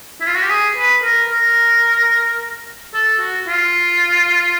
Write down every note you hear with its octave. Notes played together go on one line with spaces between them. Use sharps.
E4
F4
F#4
G4
G#4
B4
A#4
A#4
A4
F#4
F4